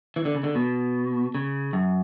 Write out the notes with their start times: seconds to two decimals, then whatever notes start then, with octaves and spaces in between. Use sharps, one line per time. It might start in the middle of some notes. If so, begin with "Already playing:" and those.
0.16 E3
0.25 D3
0.35 C#3
0.43 D3
0.55 B2
1.35 C#3
1.73 F#2